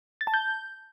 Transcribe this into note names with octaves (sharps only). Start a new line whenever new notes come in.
A6
A5
G6